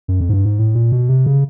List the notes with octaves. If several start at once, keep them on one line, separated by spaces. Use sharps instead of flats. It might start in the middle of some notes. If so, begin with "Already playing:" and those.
F#2
F2
G#2
G2
G#2
A2
A#2
B2
C3
C#3